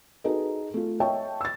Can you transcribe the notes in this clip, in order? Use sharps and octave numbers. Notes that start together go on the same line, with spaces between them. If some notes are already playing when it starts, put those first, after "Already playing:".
D#4 F#4 G#4 A4 B4 D#5
A3 F4
C#5 D#5 E5 G5 A5 C#6
E6 A6